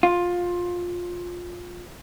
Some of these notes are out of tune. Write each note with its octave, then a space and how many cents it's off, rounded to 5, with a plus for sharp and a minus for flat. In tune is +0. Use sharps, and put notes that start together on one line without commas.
F4 +15